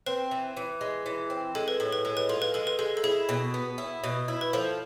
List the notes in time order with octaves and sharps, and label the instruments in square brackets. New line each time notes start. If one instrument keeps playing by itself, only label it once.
[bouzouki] C4 [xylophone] B4
[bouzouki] E3
E3
G#3
E3
C4
[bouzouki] G#3 [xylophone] A4
[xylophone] B4
[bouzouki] A2 [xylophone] A4
[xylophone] B4
[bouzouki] G#3 [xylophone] A4
[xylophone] B4
[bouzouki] F4 [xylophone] A4
[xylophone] B4
[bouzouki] G#3 [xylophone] A4
[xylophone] B4
[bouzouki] G#3 [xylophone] A4
[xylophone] A4
[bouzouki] E4 [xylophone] G#4
[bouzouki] B2
B3
E4
B2
E4
[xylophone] B4
[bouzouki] F3 [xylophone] A4